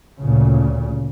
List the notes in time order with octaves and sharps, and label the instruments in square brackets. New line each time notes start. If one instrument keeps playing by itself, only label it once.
[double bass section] D2 A#2 C#3